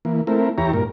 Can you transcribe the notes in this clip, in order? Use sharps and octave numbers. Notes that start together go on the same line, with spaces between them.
E3 A#3
A3 C4 E4 A#4
E2 E4 G4 C#5 A#5
G2 A#2 A#4